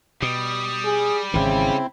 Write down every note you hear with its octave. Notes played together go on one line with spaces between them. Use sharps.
B2 G3 D#6
G#4
G#1 C#3 E3 C4 E4